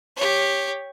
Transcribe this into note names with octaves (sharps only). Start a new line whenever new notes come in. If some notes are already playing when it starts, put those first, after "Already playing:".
G4 C#5